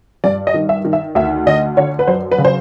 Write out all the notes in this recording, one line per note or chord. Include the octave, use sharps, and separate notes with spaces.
G2 D5
D#5
D#3
E5
D#3
E5
D2 E5
D3 D#5
D3 C#5
B4
F#2 C5
B4
C#3
C5